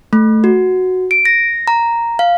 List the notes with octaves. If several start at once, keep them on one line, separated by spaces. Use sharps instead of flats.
A3
F#4
D7
A#6
A#5
F5